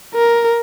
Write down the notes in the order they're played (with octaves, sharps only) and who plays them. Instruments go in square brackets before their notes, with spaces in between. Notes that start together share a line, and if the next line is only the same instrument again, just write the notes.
[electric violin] A#4